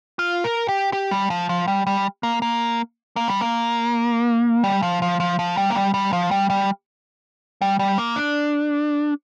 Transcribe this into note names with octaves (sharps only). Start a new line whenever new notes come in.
F4
A#4
G4
G4
G3
F3
F3
G3
G3
A#3
A#3
A#3
G3
A#3
G3
F3
F3
F3
F3
G3
A#3
G3
G3
F3
G3
G3
G3
G3
A#3
D4